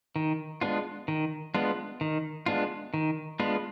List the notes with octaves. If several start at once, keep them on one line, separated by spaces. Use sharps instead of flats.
D#3
G#3 B3 D4 F4
D#3
G#3 B3 D4 F4
D#3
G#3 B3 D4 F4
D#3
G#3 B3 D4 F4